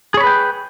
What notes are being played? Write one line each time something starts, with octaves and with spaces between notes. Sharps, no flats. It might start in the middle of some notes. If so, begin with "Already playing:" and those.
G#4 B4 C#5 G5 B5